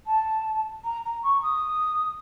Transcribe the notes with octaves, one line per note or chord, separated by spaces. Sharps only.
A5
A#5
A#5
C#6
D#6